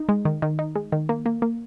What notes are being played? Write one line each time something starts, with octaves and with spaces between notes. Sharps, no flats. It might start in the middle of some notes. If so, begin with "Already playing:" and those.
Already playing: D#4
G#3
D#3
D#3
D#4
G#3
D#3
A#3
A#3
A#3